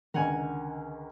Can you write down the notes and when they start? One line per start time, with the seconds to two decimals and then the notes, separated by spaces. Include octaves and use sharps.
0.14 C#2 D3 D#3 A#4 F#5 G#5